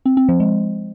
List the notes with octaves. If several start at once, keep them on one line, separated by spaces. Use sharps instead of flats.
C4
C4
F3
G#3